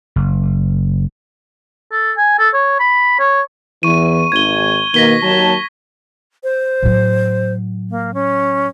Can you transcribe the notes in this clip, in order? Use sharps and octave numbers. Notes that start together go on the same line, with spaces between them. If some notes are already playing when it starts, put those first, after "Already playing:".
F#1
A4
G#5
A4
C#5
B5
C#5
E2 E3 C#6 D#7
G#1 G#6 G7
B2 D#3 A#3 A#6 B6 G7
D#2 F#3 A5
C5
A2 F#3
A#3
C#4